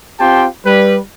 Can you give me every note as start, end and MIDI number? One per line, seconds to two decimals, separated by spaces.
0.19 0.46 60
0.19 0.46 65
0.19 0.46 67
0.19 0.46 79
0.19 0.46 81
0.19 0.46 84
0.65 0.98 55
0.65 0.98 71